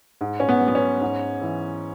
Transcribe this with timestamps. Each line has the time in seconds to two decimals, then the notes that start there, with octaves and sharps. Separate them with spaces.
0.21 G#2
0.40 C#4
0.49 B3
0.61 F#3
0.68 B3
0.75 C#4
1.01 G#2
1.41 E3